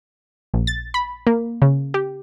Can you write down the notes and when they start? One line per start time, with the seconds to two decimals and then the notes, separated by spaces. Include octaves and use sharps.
0.54 A#1
0.67 A6
0.94 B5
1.27 A#3
1.62 C#3
1.94 G4